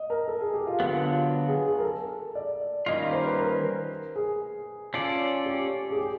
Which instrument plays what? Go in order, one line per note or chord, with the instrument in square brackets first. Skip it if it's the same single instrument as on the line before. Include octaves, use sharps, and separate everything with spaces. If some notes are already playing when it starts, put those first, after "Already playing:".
Already playing: [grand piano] D#5
A#4
A4
G#4
G4
F4
[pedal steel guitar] D3 F#3 B3 [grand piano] F4
[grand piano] F4
G#4
G#4
A#4
A4
D5
[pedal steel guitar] D#3 G3 A#3 C#4 F4 [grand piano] D#5
[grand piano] C5
B4
A#4
G#4
[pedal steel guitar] C#4 F4 A4 D5
[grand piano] G4
G#4
G4